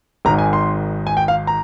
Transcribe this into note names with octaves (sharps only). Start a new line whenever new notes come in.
G#1 G#2 D#3 A#5
G#5
C6
G#5
G5
F5
A#5